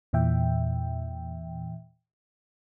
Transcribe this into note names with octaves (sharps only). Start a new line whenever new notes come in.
E2 A#2 E3 E5 G5